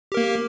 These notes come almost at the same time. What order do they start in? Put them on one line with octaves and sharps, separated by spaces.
G4 A#4 A#3